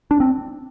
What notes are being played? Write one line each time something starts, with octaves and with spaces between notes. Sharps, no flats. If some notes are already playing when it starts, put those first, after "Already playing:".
D4
C4